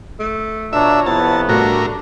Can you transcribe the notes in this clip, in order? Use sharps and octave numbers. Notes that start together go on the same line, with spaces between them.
A3
B2 D4 F4 C#5 E5 A#5
F2 C3 B3 E4 A5
A2 G3 A3 D4 F#4 A#4